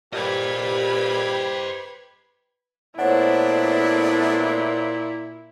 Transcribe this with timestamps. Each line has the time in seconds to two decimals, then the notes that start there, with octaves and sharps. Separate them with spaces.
0.13 A#2 G4 B4 C5 D#5 B5 G#6
2.99 A#2 A3 B3 D4 E4 C5 C#5 F#5